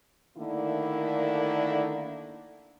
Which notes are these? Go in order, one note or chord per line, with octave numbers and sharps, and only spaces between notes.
D3 D#3 A3 A#3 D4 E4